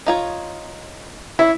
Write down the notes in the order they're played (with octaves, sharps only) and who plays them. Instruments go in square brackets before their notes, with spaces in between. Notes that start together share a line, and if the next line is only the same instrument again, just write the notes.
[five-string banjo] D#4 F4 C#5
[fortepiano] E4 [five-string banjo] C#5